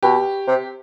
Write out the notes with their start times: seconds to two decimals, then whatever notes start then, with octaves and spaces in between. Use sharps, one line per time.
0.02 B2 G4
0.48 C3